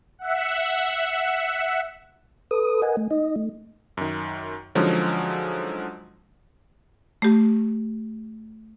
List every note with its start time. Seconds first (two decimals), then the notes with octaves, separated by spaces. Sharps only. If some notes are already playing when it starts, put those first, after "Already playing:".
0.19 E5 F#5
2.51 A4 B4 D#6
2.82 A#4 D#5 F#5 G#5
2.97 A3
3.11 D#4 D#5
3.36 A3
3.97 F#2 D#3
4.75 D3 F3 F#3 G#3 C#4 D#4
7.22 A3 G4